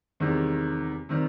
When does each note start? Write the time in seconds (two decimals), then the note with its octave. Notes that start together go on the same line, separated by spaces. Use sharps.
0.20 E2 C3 D#3 G3
1.09 C3 D#3 G3